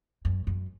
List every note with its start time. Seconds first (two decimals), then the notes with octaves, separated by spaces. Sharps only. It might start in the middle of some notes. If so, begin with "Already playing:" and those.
0.25 F#2
0.47 F#2